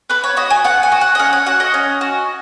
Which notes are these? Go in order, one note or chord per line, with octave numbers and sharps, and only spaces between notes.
B3 B4
C#5
F#4 D#5
G#5
B3 F#5
G#5
F#4
F#5
D#5
C#4 F#5
G#5
F#4 F#5
D#5
C#4
F#4